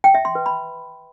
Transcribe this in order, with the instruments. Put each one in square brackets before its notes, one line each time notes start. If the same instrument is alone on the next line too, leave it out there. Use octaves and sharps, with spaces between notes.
[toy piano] G5
E5
C6
B4
B5